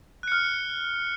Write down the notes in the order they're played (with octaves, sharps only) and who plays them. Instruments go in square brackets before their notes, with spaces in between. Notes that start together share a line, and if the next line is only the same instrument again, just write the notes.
[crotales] F#6
C#7
F6